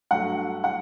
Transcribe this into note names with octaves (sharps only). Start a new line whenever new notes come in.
G2 F#3 A3 F#5
F#5